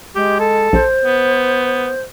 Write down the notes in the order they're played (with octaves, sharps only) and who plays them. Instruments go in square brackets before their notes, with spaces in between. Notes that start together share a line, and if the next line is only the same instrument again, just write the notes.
[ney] G#3 [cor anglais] G4
[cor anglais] A4
[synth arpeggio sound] A#1 [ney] C5
[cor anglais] B3